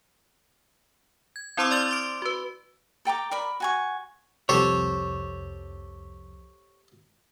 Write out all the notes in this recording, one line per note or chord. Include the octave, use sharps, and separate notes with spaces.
G#6
C4 E4 C5 C6 D6 E6
D5 C6 F6 A6 F#7 G7
C6 D6 D7
F#4 B4
A4 G5 A#5 D6
A#4 D5 B5
F#4 G#5 C#6
C2 F2 G4 A4 C5 C#5